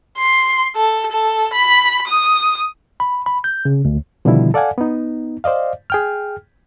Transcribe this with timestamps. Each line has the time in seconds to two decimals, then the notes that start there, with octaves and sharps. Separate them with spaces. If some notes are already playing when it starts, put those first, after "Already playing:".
0.18 C6
0.76 A4
1.12 A4
1.53 B5
2.07 D#6
3.00 B5
3.26 B5
3.44 G6
3.65 C#3
3.85 D2
4.25 B2 D3 D#3 F3 G3 E4
4.54 A4 D5 F5 F#5 G#5
4.78 B3 D#4
5.44 C5 D5 D#5 F5
5.90 G#4 G5 F6